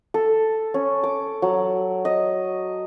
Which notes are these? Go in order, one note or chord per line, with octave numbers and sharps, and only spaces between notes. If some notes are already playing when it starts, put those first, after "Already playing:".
A4
C#4
D6
F#3
D#5